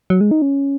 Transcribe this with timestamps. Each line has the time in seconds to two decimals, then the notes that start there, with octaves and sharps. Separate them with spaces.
0.10 F#3
0.21 G#3
0.31 D#4
0.42 C#4